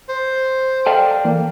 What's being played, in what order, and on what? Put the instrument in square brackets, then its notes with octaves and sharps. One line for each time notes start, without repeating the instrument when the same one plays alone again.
[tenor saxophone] C5
[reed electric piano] A4 [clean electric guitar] D5 F5 G5
[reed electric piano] E3 A#3